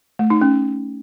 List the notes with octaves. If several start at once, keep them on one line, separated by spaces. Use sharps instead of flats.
A3
D#4
C#4